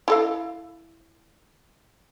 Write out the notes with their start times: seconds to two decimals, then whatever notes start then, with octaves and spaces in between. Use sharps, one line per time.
0.08 E4 A4 F5